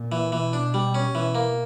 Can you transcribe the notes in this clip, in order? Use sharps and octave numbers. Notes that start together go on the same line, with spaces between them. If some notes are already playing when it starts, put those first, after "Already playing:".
Already playing: A#2
E3
B2 E3
D4
G3
C#4
B2 E3
A#3